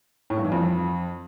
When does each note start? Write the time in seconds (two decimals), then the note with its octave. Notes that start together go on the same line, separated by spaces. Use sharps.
0.30 A2
0.37 G2
0.45 E3
0.52 F2